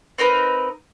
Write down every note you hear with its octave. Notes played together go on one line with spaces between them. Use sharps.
C4 D#4 A#4 B4